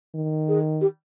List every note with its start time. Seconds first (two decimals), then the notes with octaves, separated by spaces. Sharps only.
0.15 D#3
0.48 G#4
0.81 G4